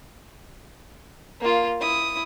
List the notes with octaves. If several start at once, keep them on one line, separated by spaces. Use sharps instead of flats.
A#3 F4
E4 D#6